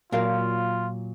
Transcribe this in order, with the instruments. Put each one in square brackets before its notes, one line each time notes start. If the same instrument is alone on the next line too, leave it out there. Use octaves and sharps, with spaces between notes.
[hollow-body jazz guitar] A#2 F#3 [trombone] F4 [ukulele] A#4 D5 F5